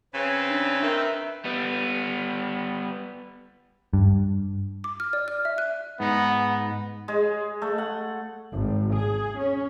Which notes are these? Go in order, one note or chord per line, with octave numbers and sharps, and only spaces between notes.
C#3 C4 B4
D4
D#3 E5
G3 B3
G2
D6
F6
D5
F6
E5
F#6
G#2 B3 D#4
G#3
A3
F#5
G#1
G#4
C#4